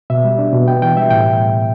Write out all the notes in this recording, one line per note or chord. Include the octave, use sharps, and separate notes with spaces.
B2 E5
G3
D4
B2
B3 G5
E3 G5
G3 E5
A2 G5